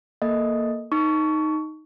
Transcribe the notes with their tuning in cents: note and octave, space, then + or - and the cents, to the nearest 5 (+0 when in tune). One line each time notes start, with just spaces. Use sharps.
A#3 +0 A4 +0 D#5 +0
D#4 +0 C#6 +20